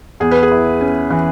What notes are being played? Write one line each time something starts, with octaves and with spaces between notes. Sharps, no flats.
E2 G#4
B4
G#4
E4
C#4
E3